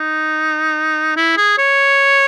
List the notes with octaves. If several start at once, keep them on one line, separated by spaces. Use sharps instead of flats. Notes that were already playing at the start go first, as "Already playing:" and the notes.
Already playing: D#4
E4
G#4
C#5